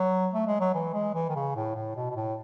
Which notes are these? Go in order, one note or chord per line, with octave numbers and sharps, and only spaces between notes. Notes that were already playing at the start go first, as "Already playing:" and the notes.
Already playing: F#3
A3
G#3
F#3
E3
G#3
E3
D#3
C#3
A2
A2
B2
B2
A2